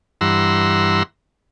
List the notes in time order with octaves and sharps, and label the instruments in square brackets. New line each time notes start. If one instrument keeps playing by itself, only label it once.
[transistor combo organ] G2 E3 F#5 A#5 C6 E6